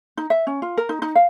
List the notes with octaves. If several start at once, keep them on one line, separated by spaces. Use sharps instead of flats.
D#4
E5
C#4
F4
A#4
D#4
D#4
F5